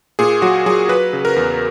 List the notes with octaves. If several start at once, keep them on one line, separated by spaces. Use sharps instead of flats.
A#2 G#4
F#3 F#4
F#3 G#4
F#3 B4
C#3
A#4
E2